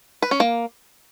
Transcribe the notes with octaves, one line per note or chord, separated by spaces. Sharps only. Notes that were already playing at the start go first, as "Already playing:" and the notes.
B4
C#4
A#3